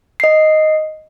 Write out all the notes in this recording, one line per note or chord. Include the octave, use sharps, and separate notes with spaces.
D#5 C7